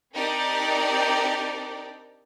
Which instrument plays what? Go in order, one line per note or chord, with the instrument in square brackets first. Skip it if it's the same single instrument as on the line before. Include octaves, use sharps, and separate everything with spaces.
[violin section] C4 D4 D#4 G4 A#4 D5